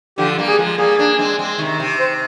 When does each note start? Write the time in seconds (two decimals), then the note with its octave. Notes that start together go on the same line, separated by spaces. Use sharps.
0.18 D3 F3 G4
0.39 G3 A#3
0.48 G#4
0.58 F3 G#3
0.78 G3 A#3 G#4
0.98 A#3 D4
1.19 G#3 C4
1.39 G#3 C4
1.58 C3 D#3
1.80 C3
1.99 C5